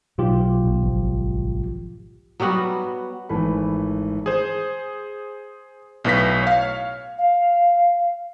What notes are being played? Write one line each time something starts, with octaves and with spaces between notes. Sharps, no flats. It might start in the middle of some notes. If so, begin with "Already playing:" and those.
B1 A2 F4 G4
A#1 B3
G#1 F3
F#3 G3 B3 F#4
G#1 E3 A3 B5
G#4 C5
B1 A2 B4 A#6 B6
C#5 F5
F5